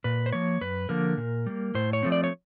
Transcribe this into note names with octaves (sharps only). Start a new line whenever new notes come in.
A#2 B4
C5
F3 A#3 C#5
F#2 B4
D3 F3 A#3 A#4
A#2
G3 A#3
A2 C5
C#5
F3 A3 C4
D5
C#5